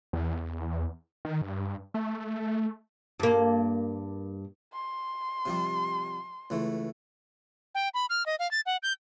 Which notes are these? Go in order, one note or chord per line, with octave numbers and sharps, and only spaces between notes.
E2
D#3
G2
A3
G2 A#3
C6
C3 F3 G3
C#2 E3 A3
G5
B5
F6
D#5
F5
A6
F#5
G6